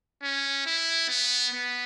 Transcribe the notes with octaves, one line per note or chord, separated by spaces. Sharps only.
C#4
E4
B3
B3